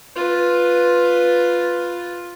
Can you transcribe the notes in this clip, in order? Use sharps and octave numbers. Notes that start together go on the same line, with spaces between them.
F4 B4